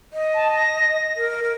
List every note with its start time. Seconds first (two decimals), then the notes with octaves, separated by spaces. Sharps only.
0.13 D#5
0.34 A5
0.56 A#6
1.17 A#4
1.43 A#4